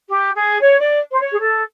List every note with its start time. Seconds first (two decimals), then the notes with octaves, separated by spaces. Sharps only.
0.09 G4
0.35 G#4
0.61 C#5
0.80 D5
1.12 C5
1.20 C#5
1.32 G#4
1.39 A4